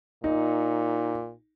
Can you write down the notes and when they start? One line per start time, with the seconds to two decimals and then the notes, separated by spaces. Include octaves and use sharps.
0.24 A#2 D#4